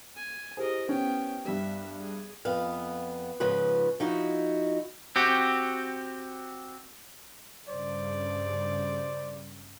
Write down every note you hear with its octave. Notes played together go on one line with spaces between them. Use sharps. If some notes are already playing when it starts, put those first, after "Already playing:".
G#5
E4 G4 G#4 A#4 C5 D#5
B3 C#4 G5
G2 G3 E5
G#4
F2 B3 F5
G#2 C#3 F3 B4
F3 D#4 E4 F#4
C4 F#4 G4
G2 C#3 C5 D5